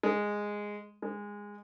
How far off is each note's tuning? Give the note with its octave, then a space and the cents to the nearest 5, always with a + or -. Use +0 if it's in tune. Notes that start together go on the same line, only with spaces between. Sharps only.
G#3 -5
G#3 -15